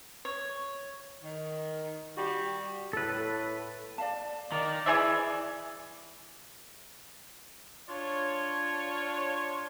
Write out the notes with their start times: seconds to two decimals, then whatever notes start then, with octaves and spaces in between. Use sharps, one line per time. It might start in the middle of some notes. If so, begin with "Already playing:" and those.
0.25 C#5
1.24 D#3
2.17 G3 F#4 G4
2.93 A2 A4 B4
3.98 D5 F5 A5
4.52 D#3 A#4 D5 D#5 A#5
4.86 E3 G#4 D5 E5
7.89 D4 F4 C#5